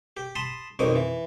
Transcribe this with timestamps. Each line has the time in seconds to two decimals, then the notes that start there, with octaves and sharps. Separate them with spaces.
0.17 G4
0.35 A5 B5 C6 D#6
0.79 B1 F2 D#3 D#5 D6
0.96 E3